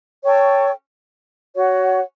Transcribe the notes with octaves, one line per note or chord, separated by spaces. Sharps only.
A4 C#5 G5 C#6
F#4 C#5 F#5